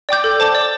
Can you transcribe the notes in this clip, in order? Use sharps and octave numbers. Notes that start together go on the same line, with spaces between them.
D5 G5 D6 G6
A4
C5 A5 D6
D5